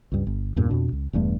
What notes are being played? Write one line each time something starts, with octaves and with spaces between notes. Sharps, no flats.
C#2 G2
G1
E2 G2 A#2
F2 B2 D4
C#2
E1 E2 G2 A3